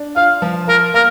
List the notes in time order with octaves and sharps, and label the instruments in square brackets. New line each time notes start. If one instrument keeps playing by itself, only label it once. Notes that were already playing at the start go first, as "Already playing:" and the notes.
Already playing: [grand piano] D4
[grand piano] F4 [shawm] F5
[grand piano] F3
[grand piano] F4 [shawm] A#4
[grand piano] A#3 [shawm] A#4